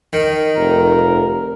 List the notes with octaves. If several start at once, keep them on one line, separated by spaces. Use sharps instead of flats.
D#3
F1 A#4